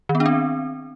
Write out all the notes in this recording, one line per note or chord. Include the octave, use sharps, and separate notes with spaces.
D#3
B3
D4
C4